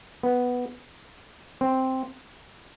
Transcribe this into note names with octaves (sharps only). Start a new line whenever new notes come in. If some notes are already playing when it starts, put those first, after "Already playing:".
B3
C4